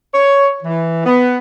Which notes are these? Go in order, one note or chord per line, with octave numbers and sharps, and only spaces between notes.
C#5
E3
B3